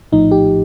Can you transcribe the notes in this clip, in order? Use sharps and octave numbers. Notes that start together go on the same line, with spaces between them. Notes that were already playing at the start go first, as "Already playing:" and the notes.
A#1 A2 F3 D#4
G4